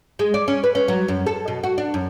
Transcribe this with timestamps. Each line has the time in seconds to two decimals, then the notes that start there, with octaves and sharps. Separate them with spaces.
0.19 G#3
0.34 D5
0.48 C#4
0.64 B4
0.75 C#4
0.88 F#3
1.08 F#2
1.26 A4
1.48 B2
1.64 F#4
1.78 D4
1.94 F#2